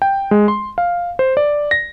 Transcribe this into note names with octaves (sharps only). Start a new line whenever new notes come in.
G5
G#3
C6
F5
C5
D5
A#6